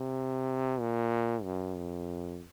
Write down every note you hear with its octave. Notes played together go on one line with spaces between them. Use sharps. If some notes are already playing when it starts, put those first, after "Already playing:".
Already playing: C3
A#2
F#2
F2